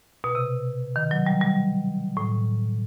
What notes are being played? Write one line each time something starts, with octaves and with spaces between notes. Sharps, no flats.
B2
C3
D#3
F#3
G3
G3
A2